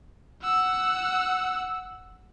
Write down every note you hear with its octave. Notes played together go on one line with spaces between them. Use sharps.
F#5 E6